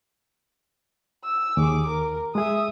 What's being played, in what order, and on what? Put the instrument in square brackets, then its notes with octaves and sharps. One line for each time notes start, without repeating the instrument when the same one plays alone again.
[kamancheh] E6
[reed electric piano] D#2 [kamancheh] G#4 D6
[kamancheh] A#4
[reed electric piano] G#3 G#4 [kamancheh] E5 D#6